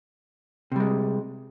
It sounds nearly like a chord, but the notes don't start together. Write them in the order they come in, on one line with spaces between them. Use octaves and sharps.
C3 G3 G#3